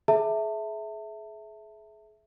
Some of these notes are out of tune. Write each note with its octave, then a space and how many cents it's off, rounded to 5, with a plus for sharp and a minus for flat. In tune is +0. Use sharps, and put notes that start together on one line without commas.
G#4 +35 E5 -5 A5 +35